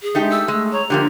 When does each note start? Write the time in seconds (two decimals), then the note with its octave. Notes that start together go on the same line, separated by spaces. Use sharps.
0.02 G#4
0.15 G#3 A3 D#4 G4
0.30 E6
0.48 G#3 A3
0.73 C#5 A#5
0.90 D3 F3 A#3 G4